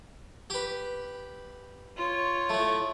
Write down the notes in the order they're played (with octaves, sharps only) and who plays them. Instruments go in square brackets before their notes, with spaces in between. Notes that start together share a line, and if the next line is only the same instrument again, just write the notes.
[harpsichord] G4 B4
[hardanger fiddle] F4 C#5
[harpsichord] A2 A3